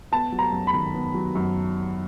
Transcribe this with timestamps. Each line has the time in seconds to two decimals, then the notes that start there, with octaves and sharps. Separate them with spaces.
0.12 B3 A5
0.32 F#3
0.39 A#5
0.52 F#2
0.67 B5
0.74 D#3
0.94 B3
1.14 F#3
1.35 F#2